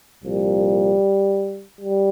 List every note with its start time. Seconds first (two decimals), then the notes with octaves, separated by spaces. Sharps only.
0.23 C2 A#2 F3 G3
1.80 G3